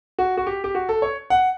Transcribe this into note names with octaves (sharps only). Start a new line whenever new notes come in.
F#4
F#4
G4
G4
F#4
A4
C#5
F#5